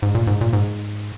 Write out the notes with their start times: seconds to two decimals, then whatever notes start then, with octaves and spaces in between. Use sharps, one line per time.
0.02 G#2
0.15 A#2
0.27 G#2
0.41 A#2
0.53 G#2